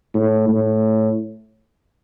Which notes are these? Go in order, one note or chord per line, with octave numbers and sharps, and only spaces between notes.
A2
A2